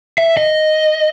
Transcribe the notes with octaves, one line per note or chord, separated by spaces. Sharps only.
E5
D#5